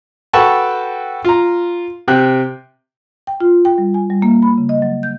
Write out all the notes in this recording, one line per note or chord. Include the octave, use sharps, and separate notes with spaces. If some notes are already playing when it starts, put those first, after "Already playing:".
F#4 A4 B4 G5 A5 C#6
F4 A#5
C3 G5 F#6
G5
F4
G5
G3
G#5
G3
A#3
B5
C#3
D#5
F#3
G6